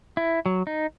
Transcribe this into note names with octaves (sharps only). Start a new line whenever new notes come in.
E4
F#3
D#4